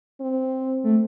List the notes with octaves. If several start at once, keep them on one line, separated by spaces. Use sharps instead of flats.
C4
A3